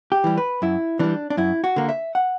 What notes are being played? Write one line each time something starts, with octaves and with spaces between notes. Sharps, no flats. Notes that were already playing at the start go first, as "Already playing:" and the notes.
G4
E3 G3
B4
F#2 E4
E3 G3 D4
D4
F#2 E4
F#4
D3 A#3
E5
F#5